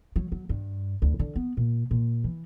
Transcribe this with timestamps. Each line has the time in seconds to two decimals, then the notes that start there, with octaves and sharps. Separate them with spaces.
0.16 F#3
0.32 F#3
0.49 G2
1.02 D2
1.19 D3
1.36 B3
1.57 A#2
1.91 A#2
2.24 E3